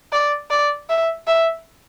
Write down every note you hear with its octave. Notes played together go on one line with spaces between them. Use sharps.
D5
D5
E5
E5